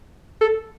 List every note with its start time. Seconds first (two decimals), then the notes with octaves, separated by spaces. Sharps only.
0.41 A4